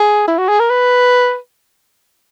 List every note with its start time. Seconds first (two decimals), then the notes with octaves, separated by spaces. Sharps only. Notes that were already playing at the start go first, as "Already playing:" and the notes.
Already playing: G#4
0.27 E4
0.38 F#4
0.48 G#4
0.59 A#4
0.70 B4